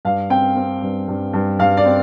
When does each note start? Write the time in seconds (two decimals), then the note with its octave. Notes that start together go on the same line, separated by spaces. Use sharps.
0.05 G2 F5
0.30 C4 G5
0.56 C4
0.82 G2
1.08 G2
1.33 G2
1.59 G2 F5
1.77 D5
1.85 C4